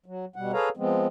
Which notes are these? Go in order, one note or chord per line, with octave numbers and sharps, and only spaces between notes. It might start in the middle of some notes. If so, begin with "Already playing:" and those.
F#3
B2 G3 F#5
G#4 A4 B4 C#5 F5 A#5
F3 G#3 B3 C4